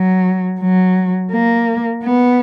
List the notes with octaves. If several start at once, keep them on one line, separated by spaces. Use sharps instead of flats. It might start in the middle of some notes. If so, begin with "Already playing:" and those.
Already playing: F#3
F#3
A#3
B3